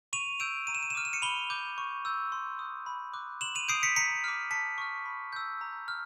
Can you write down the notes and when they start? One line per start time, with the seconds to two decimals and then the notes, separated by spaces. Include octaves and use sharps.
0.13 C#6 D#7 F7
0.40 E6 G6 D7 E7
0.67 A#5 D#7
0.75 E7
0.83 D#7
0.90 E7
0.95 D6 F6 D#7
1.05 E7
1.13 C#7 D#7
1.22 B5 F7 G7
1.50 D6 G6
1.78 C#6
2.05 E6 G6
2.32 C6
2.59 D#6 F#6
2.86 B5
3.14 D6 F#6
3.41 C6 E7 F#7
3.55 D#7 F7
3.68 D#6 G6 C7 D7
3.83 B6 C#7
3.96 A#5 B6 C#7
4.24 D6 F6
4.51 A5 B6 C#7
4.78 C#6 F6
5.06 B5
5.33 E6 G6
5.61 A#5
5.88 F6